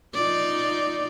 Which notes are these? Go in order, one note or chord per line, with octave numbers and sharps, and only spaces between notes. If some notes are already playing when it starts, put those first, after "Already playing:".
D#4 F4 D5